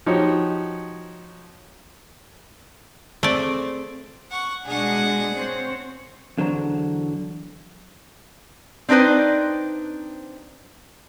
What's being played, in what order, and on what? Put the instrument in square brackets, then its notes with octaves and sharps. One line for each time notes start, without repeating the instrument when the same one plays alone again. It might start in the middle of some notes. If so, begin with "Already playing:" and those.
[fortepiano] F3 D#4 F#4 G4 C#5
[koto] A3 D5 [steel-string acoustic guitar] C4 G#4 C5
[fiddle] F#5 C#6
[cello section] B2 G#3 D4 [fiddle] G#4 F#5
[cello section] C4 C5 C#5
[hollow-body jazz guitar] E2 D3 F#3 C5 A#5
[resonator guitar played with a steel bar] C4 D4 D#4 B4 C5